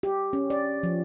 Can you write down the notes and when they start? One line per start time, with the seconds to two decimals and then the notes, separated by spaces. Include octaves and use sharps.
0.03 G4
0.33 C#4
0.50 D5
0.83 F3